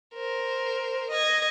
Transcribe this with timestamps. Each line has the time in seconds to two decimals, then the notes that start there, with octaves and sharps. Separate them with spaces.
0.15 A#4 C5
1.11 D#5 G#6